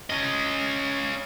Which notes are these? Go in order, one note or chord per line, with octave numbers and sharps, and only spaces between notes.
C#4 D#5